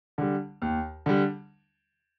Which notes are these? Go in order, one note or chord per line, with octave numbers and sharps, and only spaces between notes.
D3 G3
D#2
D3 G3